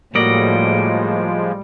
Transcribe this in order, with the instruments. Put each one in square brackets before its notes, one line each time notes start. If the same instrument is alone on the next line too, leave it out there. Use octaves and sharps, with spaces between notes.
[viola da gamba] A2 [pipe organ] F3 G#3 [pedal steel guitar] G3 D5 D#5 [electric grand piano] A#3 F#4